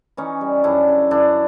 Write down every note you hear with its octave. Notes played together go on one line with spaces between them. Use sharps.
E3 C#4 D#4
G3
F#2 D4 E4
C#3
F#2 D4 E4